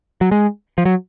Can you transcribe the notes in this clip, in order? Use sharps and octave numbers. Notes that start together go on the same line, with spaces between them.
F#3
G#3
F3
F#3